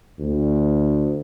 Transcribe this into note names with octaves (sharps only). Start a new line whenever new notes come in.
D2